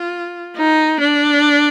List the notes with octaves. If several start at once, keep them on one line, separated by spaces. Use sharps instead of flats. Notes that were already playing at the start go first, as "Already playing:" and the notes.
Already playing: F4
D#4
D4